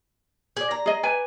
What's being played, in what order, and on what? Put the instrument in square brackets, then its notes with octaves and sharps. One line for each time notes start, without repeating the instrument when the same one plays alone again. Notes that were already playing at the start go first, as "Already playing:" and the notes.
[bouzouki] G#4 D5
A#5
[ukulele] G#4 D#5
B4 D5 G#5